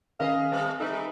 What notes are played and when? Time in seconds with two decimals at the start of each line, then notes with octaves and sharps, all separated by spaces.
0.20 D#3 C#4 G#4 A#4 B4 D#5 F5
0.52 G3 A3 C4 B4 A5
0.80 E3 G3 B3 D#4 A4 E5 B5